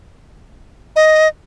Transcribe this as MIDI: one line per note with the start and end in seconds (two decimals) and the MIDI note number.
0.96 1.28 75